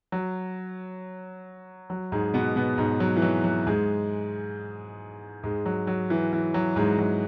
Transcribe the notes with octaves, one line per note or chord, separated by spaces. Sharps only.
F#3
F#3
G#2 G#3
B2 B3
B2 B3
G#2 G#3
F#3
E3
F#3
F#3
G#2 G#3
G#2 G#3
F#3
F#3
E3
E3
F#3
G#2 G#3
F#3